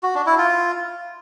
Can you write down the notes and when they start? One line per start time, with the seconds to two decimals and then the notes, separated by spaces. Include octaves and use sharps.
0.03 F#4
0.15 D4
0.26 E4
0.38 F4